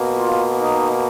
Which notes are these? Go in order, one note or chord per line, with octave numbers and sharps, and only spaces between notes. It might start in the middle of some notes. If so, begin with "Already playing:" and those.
Already playing: B2 A#3
F4
D#4